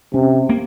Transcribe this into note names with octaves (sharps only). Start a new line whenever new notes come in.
C3 C#4
A#3